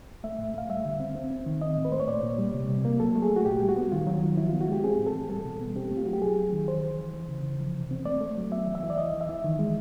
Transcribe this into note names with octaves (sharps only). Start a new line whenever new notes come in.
A3 E5
A2
A3 F5
G3 E5
D3
C4
C4
C4
D#3
C4 D#5
A2
B4
A3 C5
C#5
A#2 D5
A#2
G3
C3
C3
A#3
F#3 A4
A3
G#4
A3
F#4
A#2 G4
G3
F#4
B3
D#3 F4
F#3
D#3
F3 E4
B3 F4
F#4
G#3 G4
C4 G#4
A2
A4
E3
G3 A4
B2
B3
C4 G4
A3
F4
F#3 F#4
G4
F#3 G#4
F#3
D#3
E3 C5
E3
E3
E3
C#3
E3
F3
C3
C4
A3 D5
A3
F#3
B3 E5
E3
E5
E3
D5
E3 D#5
E3
E5
E3
D#3
G#3